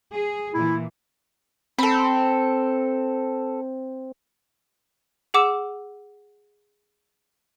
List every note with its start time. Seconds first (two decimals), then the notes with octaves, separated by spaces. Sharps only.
0.11 G#4
0.54 A#2 E3 E4
1.78 C4 A4 B5
5.34 G#4 F#5 D6 E6 E7